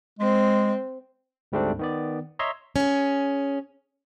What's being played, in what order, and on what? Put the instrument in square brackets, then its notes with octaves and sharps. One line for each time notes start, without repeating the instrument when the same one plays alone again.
[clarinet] G#3 [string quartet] C4
[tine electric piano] D2 G#2 G3 A3 C4 D4
D#3 B3 D5
C#5 D#5 E5 A#5 C6
[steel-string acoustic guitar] C#4 G#4